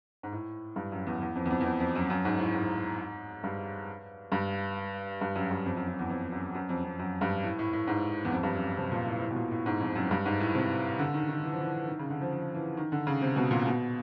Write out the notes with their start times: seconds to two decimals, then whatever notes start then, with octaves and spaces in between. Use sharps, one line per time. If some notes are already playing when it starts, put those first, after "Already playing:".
0.23 G#2
0.32 A2
0.76 G2
0.92 F#2
1.07 E2
1.22 E2
1.35 F2
1.46 E2
1.51 F2
1.61 E2
1.65 F2
1.80 F2
1.95 F#2
2.10 F#2
2.25 G#2
2.39 A2
2.54 G#2
3.44 G2
4.32 G2
5.21 G2
5.36 F#2
5.51 G2
5.66 F2
5.77 F#2
5.88 F#2
5.99 E2
6.10 F2
6.32 F#2
6.55 F#2
6.69 F2
6.84 F2
6.99 F#2
7.21 G2
7.44 A2
7.59 A2
7.73 A2
7.87 G#2
8.25 E2
8.33 F2
8.43 G2
8.55 F#2
8.77 C3
8.92 A#2
9.06 A2
9.22 A2
9.31 B2
9.36 A#2
9.51 A2
9.66 G#2
9.81 F2
9.95 F#2
10.11 G2
10.26 G#2
10.40 A2
10.55 C3
10.99 D3
11.14 D#3
11.29 D#3
11.43 E3
11.53 F3
11.61 E3
11.88 D#3
11.99 C#3
12.10 D3
12.21 F3
12.32 F3
12.54 E3
12.77 D#3
12.92 D3
13.07 C#3
13.21 C3
13.36 B2
13.51 A#2
13.66 B2